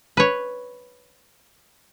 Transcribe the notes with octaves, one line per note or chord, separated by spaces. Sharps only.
B4 C#5